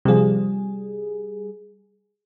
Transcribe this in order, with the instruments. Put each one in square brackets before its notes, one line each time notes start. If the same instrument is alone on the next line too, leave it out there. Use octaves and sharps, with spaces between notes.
[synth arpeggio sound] C3 F3 [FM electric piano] G3 G#4